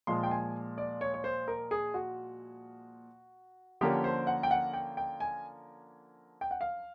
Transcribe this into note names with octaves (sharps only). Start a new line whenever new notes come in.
A#2 F3 G#3 C6
G5
G#5
D5
C#5
C#5
C5
A#4
G#4
F#4
D3 F3 A#3 C#4 G4
C5
F#5
G5
F#5
G5
G5
G#5
G5
F#5
F5